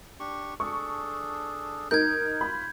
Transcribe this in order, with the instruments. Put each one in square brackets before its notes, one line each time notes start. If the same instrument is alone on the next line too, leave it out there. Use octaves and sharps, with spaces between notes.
[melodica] D4 G4 C#6
[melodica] D4 G#4 A4 [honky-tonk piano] C#6
[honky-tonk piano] D#4 A#4 [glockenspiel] G6 G#6
[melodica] F4 [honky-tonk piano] B5